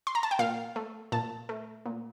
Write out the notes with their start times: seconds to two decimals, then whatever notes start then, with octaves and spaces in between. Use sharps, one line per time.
0.07 C6
0.15 A#5
0.23 A5
0.31 G5
0.39 A#2 F5
0.76 A3
1.12 A#2 A5
1.49 A3
1.86 A#2